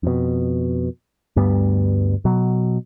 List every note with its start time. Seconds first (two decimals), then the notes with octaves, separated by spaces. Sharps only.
0.03 F2 B2
1.36 D2 G2 G3 B3
2.25 B2 F#3